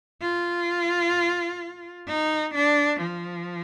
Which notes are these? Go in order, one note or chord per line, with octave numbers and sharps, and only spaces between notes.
F4
D#4
D4
F3